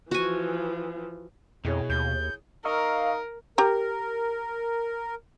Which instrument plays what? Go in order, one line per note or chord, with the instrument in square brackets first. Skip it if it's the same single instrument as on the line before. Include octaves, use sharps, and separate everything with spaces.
[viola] E3 F3 [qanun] F#4 G#5
[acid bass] F2 [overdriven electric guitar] B2 [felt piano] E4 G#4 C#5
[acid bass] D#2 [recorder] G6
[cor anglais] D#4 [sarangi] A#4 [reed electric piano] D#5 C#6 E6 [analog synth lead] F5
[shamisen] G4 A#5 [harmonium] A#4